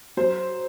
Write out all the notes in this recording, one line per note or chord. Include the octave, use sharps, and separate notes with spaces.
F#3 C5